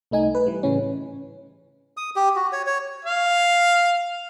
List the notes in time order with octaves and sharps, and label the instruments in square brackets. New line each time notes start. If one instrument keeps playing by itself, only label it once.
[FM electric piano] C2 A3 D#4 G#5
B4
E3 G3
A2 C#3 E3 C#4
[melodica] D#6
G4
F#4
C#5
C#5
[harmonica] F5